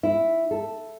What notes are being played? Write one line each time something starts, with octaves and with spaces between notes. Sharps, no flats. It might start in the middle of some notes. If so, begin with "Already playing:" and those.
E4
A4